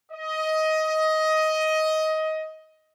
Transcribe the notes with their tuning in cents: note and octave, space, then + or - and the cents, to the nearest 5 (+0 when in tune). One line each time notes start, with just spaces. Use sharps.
D#5 +15